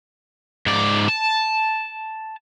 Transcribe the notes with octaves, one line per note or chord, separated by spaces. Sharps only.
G#2 D5
A5